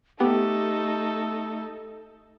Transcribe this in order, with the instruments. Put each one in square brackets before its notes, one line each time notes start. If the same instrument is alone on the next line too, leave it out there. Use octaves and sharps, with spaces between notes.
[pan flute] A3 [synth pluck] B3 [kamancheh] D#4 A4 [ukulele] G4